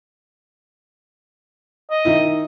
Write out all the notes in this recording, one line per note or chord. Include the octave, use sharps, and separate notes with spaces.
D#5
D#3 D#4 E4